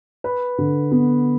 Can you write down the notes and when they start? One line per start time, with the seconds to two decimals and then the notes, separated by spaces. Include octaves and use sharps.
0.24 B4
0.58 D3
0.91 B3